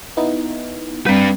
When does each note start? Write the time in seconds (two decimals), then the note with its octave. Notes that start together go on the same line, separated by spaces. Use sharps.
0.17 B3 D#4 E4
1.06 G3 C4 D4 B4